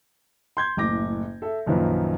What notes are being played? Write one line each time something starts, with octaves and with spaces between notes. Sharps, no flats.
C6 G6 G#6
F#1 A2 D6 A#6
A4 E5
A#1 F#2 D#3 F3 B4